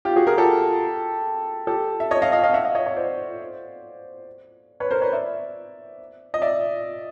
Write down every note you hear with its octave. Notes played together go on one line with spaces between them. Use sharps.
F4 G4
F#4 G#4
G#4 A#4
G4 A4
G4 A4
E5
C#5 D#5
D#5 F5
D#5 F5
D#5 F5
E5 F#5
D#5 F5
C#5 D#5
C#5 D#5
C5 D5
B4 C#5
A#4 C5
B4 C#5
D5 E5
D#5
D5 E5